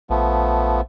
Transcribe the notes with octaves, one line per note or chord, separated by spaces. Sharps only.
A#1 F3 A3 B3